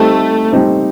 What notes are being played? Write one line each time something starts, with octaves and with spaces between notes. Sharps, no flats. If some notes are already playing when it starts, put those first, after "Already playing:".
Already playing: G3 A3 C4 D#4 G4 C5
G3 C4 D#4 G4 C5